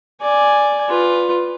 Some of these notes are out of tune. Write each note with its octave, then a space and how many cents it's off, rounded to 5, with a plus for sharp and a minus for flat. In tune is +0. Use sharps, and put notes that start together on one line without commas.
D5 +0 G#5 +0
F4 +10 B4 +10